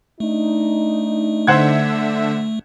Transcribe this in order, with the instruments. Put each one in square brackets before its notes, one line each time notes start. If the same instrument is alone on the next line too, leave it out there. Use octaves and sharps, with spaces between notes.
[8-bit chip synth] A3 [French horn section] D4 D#4
[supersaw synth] D3 E5 [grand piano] C5 F#5 G#6